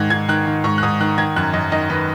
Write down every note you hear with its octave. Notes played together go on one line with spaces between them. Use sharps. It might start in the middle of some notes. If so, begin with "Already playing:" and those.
Already playing: G#2 D#3 F#6 G#6
G#2 G#6
D#3 F#6
D#3
G#2 C#6
F#6
G#2 D#6
D#3 F#6
D#3 G#6
F#2 F#6
F#2 D#5
D#3 D#5
D#3 B4